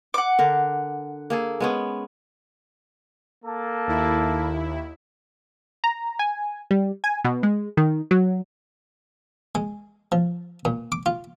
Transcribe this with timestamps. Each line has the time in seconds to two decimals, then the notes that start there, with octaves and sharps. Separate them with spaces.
0.14 F#5 D6
0.39 D3 A#4
1.30 A#3 G#4 A4
1.60 G#3 B3 C#4
3.45 A#3 A4 A5
3.87 D#2 E4
5.84 A#5
6.19 G#5
6.71 G3
7.04 G#5
7.25 B2
7.43 G#3
7.77 D#3
8.11 F#3
9.55 G#3
10.12 F3
10.65 A#2
10.92 D6
11.06 F4